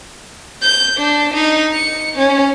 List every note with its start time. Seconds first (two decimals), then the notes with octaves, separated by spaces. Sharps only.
0.62 G6
0.97 D4
1.33 D#4
1.73 C#7
2.16 C#4